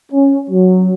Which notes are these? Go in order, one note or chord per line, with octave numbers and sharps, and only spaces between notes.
C#4
F#3